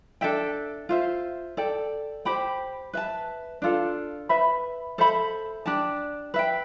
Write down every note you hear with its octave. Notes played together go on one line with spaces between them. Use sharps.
D4 A4 E5 G5
F4 C5 E5
A4 D5 G5
G4 C5 G5 B5
B4 E5 A5
D4 F4 A4
B4 E5 B5
A4 C5 E5 B5
D4 G4 D5 A5
B4 E5 G5